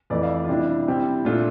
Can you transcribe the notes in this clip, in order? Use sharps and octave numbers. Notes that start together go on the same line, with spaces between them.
F2 E3 A3 D5
F5
D5
F4
C3 G3 D4 E4
C3 G3 C4 E4
A#2 A3 D4 F4